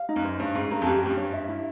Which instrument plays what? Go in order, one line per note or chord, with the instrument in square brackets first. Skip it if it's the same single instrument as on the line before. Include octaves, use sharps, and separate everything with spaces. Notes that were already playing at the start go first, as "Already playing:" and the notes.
Already playing: [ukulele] F5
D#4
[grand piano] F#2
[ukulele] C5
[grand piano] G2 [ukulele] C#5
[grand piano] G#2 [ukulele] C#4
[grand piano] G2 [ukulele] A#4
[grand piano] F2
[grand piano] F#2 [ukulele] G4
[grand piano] F#2 [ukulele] G4
[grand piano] G2
[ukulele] C#5
E5
E4